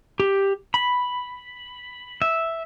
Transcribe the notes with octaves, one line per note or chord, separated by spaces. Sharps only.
G4
B5
E5